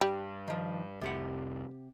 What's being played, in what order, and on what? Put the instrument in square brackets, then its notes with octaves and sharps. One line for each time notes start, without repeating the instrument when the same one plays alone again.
[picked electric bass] G2 [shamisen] G3
[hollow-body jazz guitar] D#3 F3
[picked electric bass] F1 C2 [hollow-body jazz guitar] C3 G4 F#5